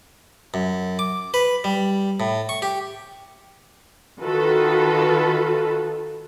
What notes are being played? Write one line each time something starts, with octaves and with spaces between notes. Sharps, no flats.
F#2
D6
B4
G3
A2
C#6
G4
D#3 F4 F#4 A4 B4